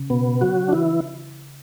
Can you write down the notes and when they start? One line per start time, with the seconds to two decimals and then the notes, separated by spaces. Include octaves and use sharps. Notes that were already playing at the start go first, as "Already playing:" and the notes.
Already playing: C#3
0.10 B2 B3
0.41 F#3 F#4
0.68 D4
0.72 E3 E4